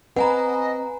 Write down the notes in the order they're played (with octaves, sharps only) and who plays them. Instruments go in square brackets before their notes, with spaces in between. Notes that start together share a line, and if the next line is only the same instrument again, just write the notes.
[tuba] C4 [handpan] B4 [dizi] D#5 [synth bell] F#5 G#5 A#5